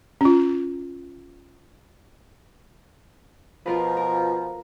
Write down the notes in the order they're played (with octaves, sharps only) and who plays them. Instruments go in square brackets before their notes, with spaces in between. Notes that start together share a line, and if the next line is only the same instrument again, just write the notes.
[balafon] C#4 F4
[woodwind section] B2 F3 [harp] F4 A#4 B4
[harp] A#4